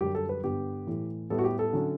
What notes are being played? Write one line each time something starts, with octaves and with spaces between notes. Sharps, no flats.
F#2 D3 G3 G4
A4
B4
G2 D3 G3 B3 G4
A2 E3 A3
A2 G3 B3 E4 A4
F#4
G4
A4
D3 F#3 C#4 E4